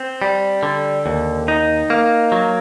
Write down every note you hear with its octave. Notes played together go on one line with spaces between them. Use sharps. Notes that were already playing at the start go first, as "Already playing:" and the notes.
Already playing: C4
G3
D3
D#2
D#4
A#3
F#3